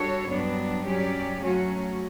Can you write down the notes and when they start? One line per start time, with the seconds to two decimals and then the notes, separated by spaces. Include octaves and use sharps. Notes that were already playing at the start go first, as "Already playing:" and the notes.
Already playing: G3 D4 F#4 A4 C#5
0.28 G2 F#3 B3 D4
0.85 F#3 C#4 G4 D5
1.41 F#3 A3 C#4 F#4